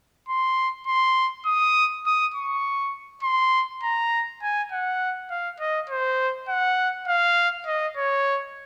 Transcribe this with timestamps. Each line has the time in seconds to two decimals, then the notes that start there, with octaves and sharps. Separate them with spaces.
0.28 C6
0.87 C6
1.46 D#6
2.06 D#6
2.34 C#6
3.23 C6
3.83 A#5
4.42 G#5
4.72 F#5
5.31 F5
5.60 D#5
5.90 C5
6.49 F#5
7.08 F5
7.67 D#5
7.97 C#5